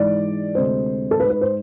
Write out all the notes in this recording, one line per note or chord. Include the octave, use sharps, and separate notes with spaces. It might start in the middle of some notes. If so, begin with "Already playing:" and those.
Already playing: G#2 E3 G#3 D5
D2 C3 G#3 C5
A4
G#2 G#3 B4
B4
C5